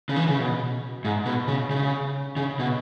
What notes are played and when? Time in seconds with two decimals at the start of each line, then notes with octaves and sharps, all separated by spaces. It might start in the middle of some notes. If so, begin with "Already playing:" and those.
0.09 C#3
0.16 E3
0.28 C#3
0.38 B2
1.05 G#2
1.26 B2
1.48 C#3
1.71 C#3
2.36 C#3
2.59 B2